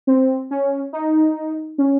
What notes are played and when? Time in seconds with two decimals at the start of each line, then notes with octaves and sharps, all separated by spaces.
0.07 C4
0.51 C#4
0.93 D#4
1.78 C#4